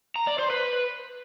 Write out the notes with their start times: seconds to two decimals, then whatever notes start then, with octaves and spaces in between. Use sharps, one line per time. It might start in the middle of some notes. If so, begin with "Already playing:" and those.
0.16 A#5
0.27 D5
0.39 C5
0.50 B4